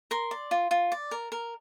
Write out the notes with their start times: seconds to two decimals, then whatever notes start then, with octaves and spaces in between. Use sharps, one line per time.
0.11 A#4 C6
0.31 D5
0.51 F4
0.71 F4
0.92 D5
1.11 A#4
1.32 A#4